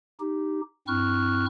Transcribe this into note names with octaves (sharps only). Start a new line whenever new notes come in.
D#4 G4
G2 C4 E4 C#6 F6 F#6